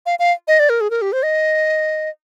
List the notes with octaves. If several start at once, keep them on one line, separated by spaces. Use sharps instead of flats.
F5
F5
D#5
D5
A#4
G#4
A#4
G4
C5
D#5